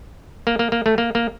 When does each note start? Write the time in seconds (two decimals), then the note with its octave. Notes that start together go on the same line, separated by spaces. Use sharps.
0.47 A#3
0.59 A#3
0.72 A#3
0.86 A3
0.98 A#3
1.15 A#3